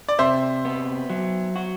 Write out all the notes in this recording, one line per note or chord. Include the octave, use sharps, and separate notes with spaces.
D5
C3 C5 E5
B3
F#3
F#4